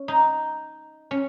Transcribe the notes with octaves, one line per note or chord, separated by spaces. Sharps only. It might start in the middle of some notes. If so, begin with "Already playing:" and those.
Already playing: C#4
D#4
C#4